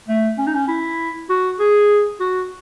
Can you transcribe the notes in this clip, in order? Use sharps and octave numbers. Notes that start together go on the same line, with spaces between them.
A3
C#4
D#4
C#4
E4
F#4
G#4
F#4